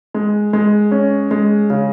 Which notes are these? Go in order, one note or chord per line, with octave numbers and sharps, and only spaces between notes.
G#3
G#3
C#4
G#3
C#3